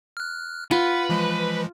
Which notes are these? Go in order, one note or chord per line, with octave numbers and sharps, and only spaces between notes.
F6 F#6
F4 B4 F#5
E3 F3 G#3